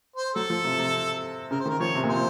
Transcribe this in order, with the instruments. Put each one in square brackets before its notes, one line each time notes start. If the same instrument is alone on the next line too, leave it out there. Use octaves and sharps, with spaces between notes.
[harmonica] C5
[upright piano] F#3 [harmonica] A4
[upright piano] F3
C3
C3
[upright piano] C#3 [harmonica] A#4
[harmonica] C5
[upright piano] D#3
[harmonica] A#4
[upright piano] F3 [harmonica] C#5
[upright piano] C3
A#2
[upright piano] C3 [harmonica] C5